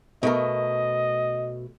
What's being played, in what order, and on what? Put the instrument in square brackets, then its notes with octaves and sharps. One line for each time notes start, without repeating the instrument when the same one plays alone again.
[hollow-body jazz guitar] B2 A3 A#4 [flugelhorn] D#5